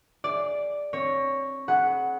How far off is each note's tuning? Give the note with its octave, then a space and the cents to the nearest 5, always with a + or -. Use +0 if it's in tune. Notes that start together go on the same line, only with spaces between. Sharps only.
G#4 +0 D5 +0
C4 +35 C#5 +0
G#4 +35 B4 +0 F#5 +0